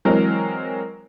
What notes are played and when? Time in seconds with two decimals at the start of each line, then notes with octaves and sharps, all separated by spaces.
0.05 E3 F#3 G#3 C4 A#4